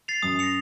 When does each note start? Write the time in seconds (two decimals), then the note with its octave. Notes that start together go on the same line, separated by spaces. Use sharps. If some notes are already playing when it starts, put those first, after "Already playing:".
0.08 A6 C7 F7
0.22 F#2 D#6
0.39 A#6 C#7 F7